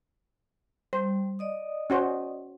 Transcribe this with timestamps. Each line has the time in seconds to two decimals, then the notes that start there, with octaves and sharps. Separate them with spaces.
0.93 G3 C5
1.39 D5 D#5 D#6
1.90 C#4 F#4 C5